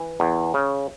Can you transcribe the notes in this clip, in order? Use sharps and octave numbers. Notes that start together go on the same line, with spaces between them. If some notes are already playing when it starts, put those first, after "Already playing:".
Already playing: E3
E2
C#3